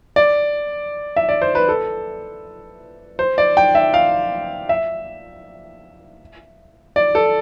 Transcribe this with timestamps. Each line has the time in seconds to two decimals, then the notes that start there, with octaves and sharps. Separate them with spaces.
0.16 D5
1.16 E5
1.29 D5
1.42 C5
1.55 B4
1.68 A4
3.19 C5
3.38 D5
3.57 G5
3.75 E5
3.94 F5
4.69 E5
6.96 D5
7.15 A4